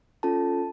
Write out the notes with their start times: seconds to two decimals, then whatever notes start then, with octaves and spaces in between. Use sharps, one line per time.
0.23 C#4 F4 A4 A5